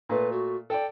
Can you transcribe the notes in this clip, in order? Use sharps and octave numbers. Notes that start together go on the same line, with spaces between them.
A#2 A3 B4
F#4
A4 D5 G5